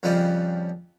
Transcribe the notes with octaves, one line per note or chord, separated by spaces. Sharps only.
F2 C#3 F3 G3 D#5